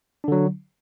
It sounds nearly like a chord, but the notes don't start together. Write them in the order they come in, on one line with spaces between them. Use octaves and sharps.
D4 D3 F#3